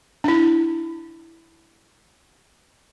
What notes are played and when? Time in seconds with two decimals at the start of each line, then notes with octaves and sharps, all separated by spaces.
0.24 D4 E4